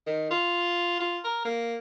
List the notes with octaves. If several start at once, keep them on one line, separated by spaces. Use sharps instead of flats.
D#3
F4
F4
A#4
A#3